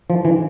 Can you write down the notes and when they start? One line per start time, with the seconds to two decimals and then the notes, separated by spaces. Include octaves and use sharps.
0.10 F3
0.25 E3